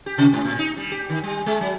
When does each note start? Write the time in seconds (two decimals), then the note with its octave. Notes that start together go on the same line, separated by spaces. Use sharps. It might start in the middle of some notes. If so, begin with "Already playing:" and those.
0.06 G4
0.18 C3
0.33 G#2
0.45 A2
0.59 D#4
0.77 G3
0.92 G4
1.09 D#3
1.23 G3
1.46 G#3
1.61 F#3